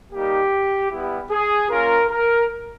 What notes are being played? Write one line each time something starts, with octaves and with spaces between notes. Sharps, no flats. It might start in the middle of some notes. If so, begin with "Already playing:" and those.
G3 A#3 D#4 G4
G3 B3 E4 G4
G#4
A#3 C#4 F4 A#4
A#4